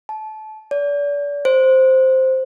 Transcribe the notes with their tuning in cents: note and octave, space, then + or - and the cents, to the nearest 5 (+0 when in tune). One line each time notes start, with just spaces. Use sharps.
A5 -25
D5 -35
C5 +0